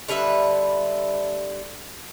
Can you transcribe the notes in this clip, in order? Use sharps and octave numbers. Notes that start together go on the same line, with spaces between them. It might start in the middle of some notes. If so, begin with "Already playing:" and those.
D3 G3 B4 E5